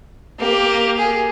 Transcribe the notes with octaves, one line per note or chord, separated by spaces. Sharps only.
A#3 G4
G#4